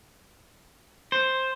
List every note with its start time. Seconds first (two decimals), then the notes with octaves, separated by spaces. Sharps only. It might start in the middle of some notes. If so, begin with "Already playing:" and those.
1.12 C5